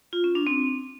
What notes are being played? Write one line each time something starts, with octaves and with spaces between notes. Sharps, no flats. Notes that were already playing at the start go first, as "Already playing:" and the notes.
F4
C#4
D4
C4